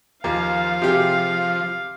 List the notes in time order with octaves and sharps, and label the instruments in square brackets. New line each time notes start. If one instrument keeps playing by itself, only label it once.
[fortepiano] D#2 [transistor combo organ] F3 [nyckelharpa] F5
[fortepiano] C3 G4 G#4